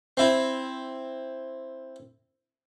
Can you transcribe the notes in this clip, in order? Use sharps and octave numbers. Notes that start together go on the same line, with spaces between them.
C4 E4